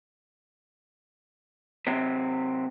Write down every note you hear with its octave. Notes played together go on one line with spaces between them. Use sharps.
C3 F#3 C4